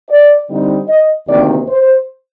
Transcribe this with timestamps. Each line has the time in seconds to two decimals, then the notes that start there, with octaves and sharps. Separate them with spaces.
0.10 D5
0.50 D3 G3 C4 D#4
0.89 D#5
1.28 D2 C3 D#3 A#3 D#4 D5
1.68 C5